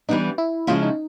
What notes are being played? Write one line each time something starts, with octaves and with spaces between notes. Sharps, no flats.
E3 G3 B3 D4 D#4
E4
C#3 F3 G#3 C#4 E4 F4
D#4